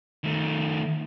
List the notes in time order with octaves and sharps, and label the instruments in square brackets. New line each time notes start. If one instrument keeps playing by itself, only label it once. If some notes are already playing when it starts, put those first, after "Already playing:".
[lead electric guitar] D#3 A3